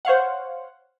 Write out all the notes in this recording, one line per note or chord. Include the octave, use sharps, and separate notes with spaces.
C5 C#5 F5 F#5